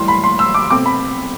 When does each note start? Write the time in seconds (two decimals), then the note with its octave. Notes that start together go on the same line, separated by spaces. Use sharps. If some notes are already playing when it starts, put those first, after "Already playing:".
Already playing: A2 E3 G3 C6
0.08 B5
0.24 C6
0.39 E6
0.54 D6
0.70 B2 A3 C4 D6
0.86 B5